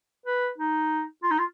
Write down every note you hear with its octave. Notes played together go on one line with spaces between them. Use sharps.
B4
D#4
F4
D#4
F4